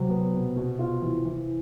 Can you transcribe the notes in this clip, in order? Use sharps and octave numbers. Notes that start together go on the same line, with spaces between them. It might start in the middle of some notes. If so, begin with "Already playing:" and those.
Already playing: C3 F#3
B3
B2
B2
F4
E3
E3